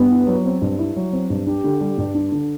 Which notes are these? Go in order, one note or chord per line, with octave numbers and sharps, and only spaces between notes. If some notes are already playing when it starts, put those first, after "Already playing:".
Already playing: G2 B3
E4
F#3
C4
G2
E4
F#3
C4
G2
D4 G4
D3
G3
G2
D4
D3